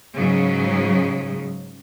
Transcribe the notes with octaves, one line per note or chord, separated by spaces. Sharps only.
G#2 C#3 F#3